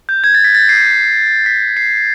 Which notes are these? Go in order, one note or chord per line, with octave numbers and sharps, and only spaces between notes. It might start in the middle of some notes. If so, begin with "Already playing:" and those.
G6
G#6
A6
B6
A6
C7
B6
C7